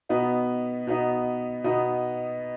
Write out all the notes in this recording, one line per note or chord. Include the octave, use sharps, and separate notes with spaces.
B2 B3 D#4
B2 B3 D#4
B2 B3 D#4